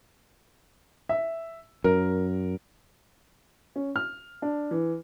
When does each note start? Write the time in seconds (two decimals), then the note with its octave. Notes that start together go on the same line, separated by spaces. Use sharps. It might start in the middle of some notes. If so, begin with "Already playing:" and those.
1.09 E5
1.84 F#2 A#4
3.76 C#4
3.96 F6
4.42 D4
4.71 E3